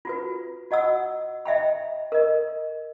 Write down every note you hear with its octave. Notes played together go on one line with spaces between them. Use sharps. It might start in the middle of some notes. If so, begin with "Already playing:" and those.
F4 F#4 B4
F#4 D#5 F#5 E6
D#5 E5 G5 B5
A#4 D#5